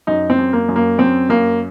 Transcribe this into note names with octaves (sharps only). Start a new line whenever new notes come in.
F#2 D#4
C4
F#2
A#3
F#2
A#3
F#2 C4
F#2 A#3